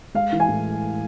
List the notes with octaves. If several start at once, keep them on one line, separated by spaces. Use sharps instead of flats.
G#3 F5
E3
G#5
A2